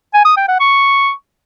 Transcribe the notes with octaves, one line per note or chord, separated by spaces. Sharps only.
G#5
D#6
G5
F#5
C#6